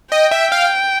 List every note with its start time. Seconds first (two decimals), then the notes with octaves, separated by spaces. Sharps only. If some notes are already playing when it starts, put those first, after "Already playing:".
0.12 D#5 G5
0.31 E5
0.52 F5